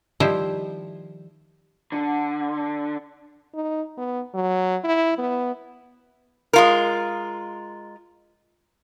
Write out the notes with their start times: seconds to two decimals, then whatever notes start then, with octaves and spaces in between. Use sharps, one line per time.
0.20 D#3 F3 G3 E4 C5
1.92 D3
3.55 D#4
3.98 B3
4.35 F#3
4.84 E4
5.18 B3
6.53 G#3 F4 A#4